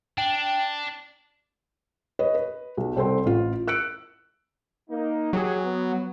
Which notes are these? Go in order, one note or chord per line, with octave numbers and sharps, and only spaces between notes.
D4 G5
B4 C#5 D#5
B4
B1
C2 C4 A4 G5 C6
A1 F4
E6 F#6 C#7 D7
A#3 D#4
F#3 G4 G#4
B3